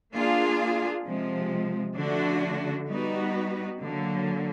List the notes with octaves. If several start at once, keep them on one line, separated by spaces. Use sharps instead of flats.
A#3 D4 F4 G#4
C3 F3 G#3
D3 F3 A3 D4 F#4
G3 B3 D#4 F#4 B4
D3 F#3 A#3